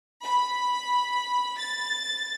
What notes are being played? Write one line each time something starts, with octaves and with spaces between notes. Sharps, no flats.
B5
A6